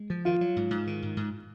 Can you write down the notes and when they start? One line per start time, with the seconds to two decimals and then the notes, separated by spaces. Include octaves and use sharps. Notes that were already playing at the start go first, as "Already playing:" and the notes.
Already playing: G#3
0.10 F3
0.25 D#3 F4
0.41 F#3
0.56 G#2
0.71 G#2
0.87 D#3
1.03 G#2
1.17 G#2